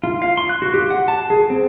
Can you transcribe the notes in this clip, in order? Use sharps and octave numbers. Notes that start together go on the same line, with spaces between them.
F4
F5
C6
F#6
F#4
G4
F#5
A5
G#4
C4